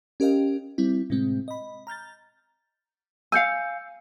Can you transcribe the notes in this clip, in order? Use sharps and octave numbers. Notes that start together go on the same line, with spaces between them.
C#4 G4 A#4 D#5 F5 G5
G3 C4 E4
A2 C3 G#3 C4
D#5 B5
A#5 F6 G6 A6
F5 G#5 E6 G6 C#7